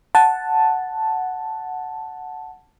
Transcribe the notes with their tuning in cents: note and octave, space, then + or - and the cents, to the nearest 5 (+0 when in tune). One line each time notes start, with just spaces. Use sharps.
F#5 +0 A5 +0